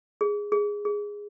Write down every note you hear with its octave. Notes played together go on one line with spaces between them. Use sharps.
G#4
G#4
G#4